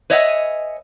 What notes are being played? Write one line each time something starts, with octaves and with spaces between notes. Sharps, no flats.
B4 C#5 D#5 E5 F#5 G#5